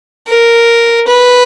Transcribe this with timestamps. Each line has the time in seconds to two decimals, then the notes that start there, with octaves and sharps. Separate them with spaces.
0.28 A#4
1.08 B4